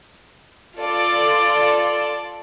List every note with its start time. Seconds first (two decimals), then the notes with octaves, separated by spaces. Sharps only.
0.78 F4 A4 D5